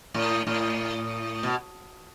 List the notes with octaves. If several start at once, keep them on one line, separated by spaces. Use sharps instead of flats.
A2
A2
B2